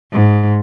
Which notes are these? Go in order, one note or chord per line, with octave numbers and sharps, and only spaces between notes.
G#2